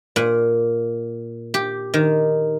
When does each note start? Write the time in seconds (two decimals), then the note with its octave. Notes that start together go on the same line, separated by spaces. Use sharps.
0.16 A#2
1.54 G4
1.94 D#3